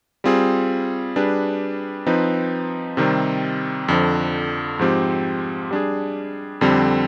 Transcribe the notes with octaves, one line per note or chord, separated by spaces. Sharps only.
G3 C4 F4 G#4
G3 D4 G#4 B4
F3 C4 D#4 B4
C3 D#3 G3 C4
F2 D3 F3
G#2 F3 C4 G4
G3 D4 G#4
F2 D3 G3 C4